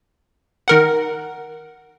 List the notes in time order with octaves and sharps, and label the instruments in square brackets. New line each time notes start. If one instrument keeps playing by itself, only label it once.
[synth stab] D#3 A#4 F#5